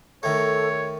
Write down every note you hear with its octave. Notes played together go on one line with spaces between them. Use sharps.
D#3 A3 A4 C#5